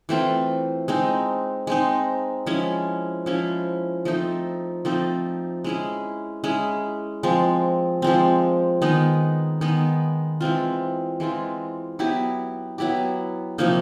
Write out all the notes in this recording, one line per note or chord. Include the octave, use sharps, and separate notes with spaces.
E3 A3 C4 F4
G#3 C4 D#4
G#3 C4 D#4
F3 G#3 C#4 E4
F3 G#3 C#4 E4
F3 A3 C4 D#4
F3 A3 C4 D#4
G#3 C#4 E4 G#4
G#3 C#4 E4 G#4
F3 G#3 C4
F3 G#3 C4
D#3 G#3 B3 D#4
D#3 G#3 B3 D#4
E3 G#3 C4 F4
E3 G#3 C4 F4
F#3 B3 E4 G4
F#3 B3 E4 G4
C3 F3 A#3 D#4